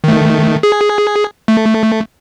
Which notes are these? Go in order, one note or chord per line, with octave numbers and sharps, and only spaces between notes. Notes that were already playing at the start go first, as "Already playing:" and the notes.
D#3 A3
G#4
A3